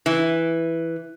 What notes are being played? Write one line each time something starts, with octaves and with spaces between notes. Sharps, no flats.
E3